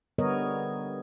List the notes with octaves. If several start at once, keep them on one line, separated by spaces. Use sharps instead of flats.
D3 G3 B3 A#4 C#5 D#5